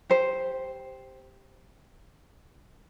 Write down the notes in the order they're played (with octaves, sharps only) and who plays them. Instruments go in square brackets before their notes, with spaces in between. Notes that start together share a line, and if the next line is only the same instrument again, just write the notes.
[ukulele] G4 C5